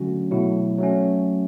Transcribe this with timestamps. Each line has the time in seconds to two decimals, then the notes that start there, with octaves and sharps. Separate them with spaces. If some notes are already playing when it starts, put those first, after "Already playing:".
Already playing: D3 F#3 A3 C#4 F#4
0.31 B2 F#3 A3 E4
0.78 F#3 A3 C#4